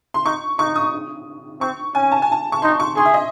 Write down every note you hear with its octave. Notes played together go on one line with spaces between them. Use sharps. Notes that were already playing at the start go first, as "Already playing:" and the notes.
C6
D#4 C#6
D#4 C#6
D#6
C4 C#6
C#4 G#5
A5
G#5
A5
C#6
D#4 C6
C#6
G#4 C6
E5
D#5